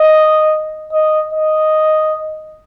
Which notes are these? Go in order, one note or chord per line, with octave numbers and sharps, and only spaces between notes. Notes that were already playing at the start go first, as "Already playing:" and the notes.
Already playing: D#5
D#5
D#5